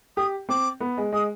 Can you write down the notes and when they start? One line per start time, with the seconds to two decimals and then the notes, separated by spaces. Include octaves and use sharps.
0.16 G4 D#6
0.49 C4 D6
0.81 B3
0.98 G#3
1.12 G#3 D#6